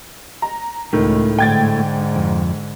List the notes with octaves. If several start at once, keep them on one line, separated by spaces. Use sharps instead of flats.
A#5
C#2 A2 D#3 A3
G#2 D3 G5 G#6 A6
F2